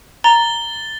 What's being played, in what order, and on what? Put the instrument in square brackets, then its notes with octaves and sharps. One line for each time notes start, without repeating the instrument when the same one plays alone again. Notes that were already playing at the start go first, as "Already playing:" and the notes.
[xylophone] A#5 [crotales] A6 G7